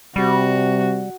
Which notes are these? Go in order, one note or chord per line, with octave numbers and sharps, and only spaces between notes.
C3 G3 F#4